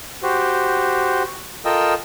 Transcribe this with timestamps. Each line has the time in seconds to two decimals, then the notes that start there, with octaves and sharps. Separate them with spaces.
0.23 F#4 G4 C5
1.65 F4 A4 A#4 D#5 G5 E6